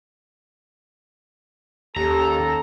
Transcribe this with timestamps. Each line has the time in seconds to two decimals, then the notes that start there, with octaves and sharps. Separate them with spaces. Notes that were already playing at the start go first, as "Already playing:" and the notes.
1.96 D#2 A#3 C#4 G4 A4 A#5